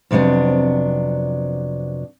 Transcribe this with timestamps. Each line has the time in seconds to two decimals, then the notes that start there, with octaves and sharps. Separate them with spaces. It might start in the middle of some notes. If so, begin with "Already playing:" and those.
0.11 F2 C3 F#3 B3 D4